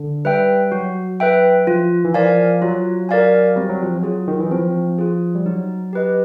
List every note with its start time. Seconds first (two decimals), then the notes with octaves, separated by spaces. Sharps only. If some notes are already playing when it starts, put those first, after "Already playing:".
Already playing: D3
0.25 G3 B4 E5 G5
0.72 F#3 F#4
1.20 B4 E5 G5
1.67 F3 F4
2.04 E3
2.14 F3 A#4 D5 F5 G#5
2.62 F#3 F4
3.09 A#4 D5 F5 G#5
3.56 G3 C4
3.69 F#3
3.83 F3
3.96 F#3
4.03 F4 G#4
4.28 D#3
4.40 E3
4.51 F3 C4
4.98 F4 G#4
5.35 G3
5.46 F#3 D#4
5.93 G4 B4 D#5